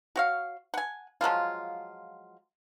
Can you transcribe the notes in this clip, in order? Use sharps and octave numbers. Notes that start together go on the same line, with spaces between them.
F#4 C#5 F5
F#5 G#5
F3 F#3 G#3 F4